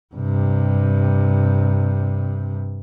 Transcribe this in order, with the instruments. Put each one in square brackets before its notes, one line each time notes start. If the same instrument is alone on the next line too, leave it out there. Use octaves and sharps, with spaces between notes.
[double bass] G2 C3